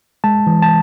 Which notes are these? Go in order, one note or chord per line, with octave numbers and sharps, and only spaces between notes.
G#3 A5
E3
A5